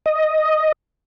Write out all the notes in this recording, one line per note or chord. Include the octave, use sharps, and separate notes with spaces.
D#5